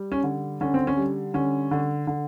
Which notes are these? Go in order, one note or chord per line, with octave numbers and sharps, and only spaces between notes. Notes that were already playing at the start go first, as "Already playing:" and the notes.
Already playing: G3
C#4
D3
D3 C#4
C4
C#4
G3
D3 C#4
D3
D3